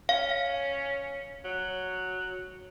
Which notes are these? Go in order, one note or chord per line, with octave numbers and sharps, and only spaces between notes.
C#4 F5
F#3